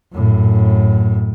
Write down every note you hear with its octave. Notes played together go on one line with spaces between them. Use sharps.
F#2 A2